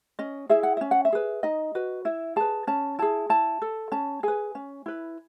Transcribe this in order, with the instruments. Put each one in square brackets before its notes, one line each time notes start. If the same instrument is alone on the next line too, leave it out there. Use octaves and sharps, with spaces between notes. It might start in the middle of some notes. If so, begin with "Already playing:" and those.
[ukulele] C#4 D#5
E4 G#4 E5
F#5
C#4 E5
F#5
E5
G#4 B4
D#4 D#5
F#4 B4
E4 E5
G#4 B4 A5
C#4 A5
E4 G#4 A5
E4 A5
A4
C#4 A5
G#4 B4 G#5
C#4
E4 B4